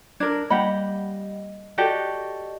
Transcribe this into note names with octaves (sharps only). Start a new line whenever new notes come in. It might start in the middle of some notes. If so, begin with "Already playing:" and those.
D4 A#4 G#6
G3 A#3 G4 D#5 F#5 B5
F#4 G4 A4 D5 D#5